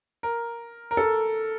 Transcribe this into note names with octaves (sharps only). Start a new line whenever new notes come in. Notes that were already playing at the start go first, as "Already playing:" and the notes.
A#4
A#4
A4